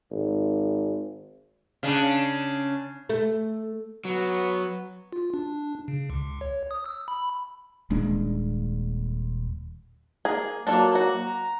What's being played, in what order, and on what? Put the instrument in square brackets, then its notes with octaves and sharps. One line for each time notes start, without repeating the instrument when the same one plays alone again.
[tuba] G#1
[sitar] C#3 D4
[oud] A3
[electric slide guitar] F#3 [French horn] B3
[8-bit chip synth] F4
D4
C#3
C#2
C#5
D#6
E6
B5
[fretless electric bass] D#1 G#3 D4
[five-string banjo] A#3 G#4
[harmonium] F#3 A#3 [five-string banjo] D4 F4 A4
[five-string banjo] F#4
[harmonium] A#5